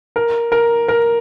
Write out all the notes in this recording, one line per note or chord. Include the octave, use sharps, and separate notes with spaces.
A#4
A#4
A#4